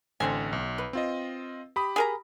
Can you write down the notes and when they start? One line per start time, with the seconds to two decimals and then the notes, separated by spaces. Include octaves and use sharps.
0.20 A1 D3 C4 C5 G#5
0.53 B1
0.78 B4
0.93 C4 F4 D#5
1.76 G4 B5 D#6
1.96 G#4 A#4 A#5